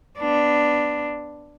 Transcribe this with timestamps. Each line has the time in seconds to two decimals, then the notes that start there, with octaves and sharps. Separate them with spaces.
0.19 B3 D4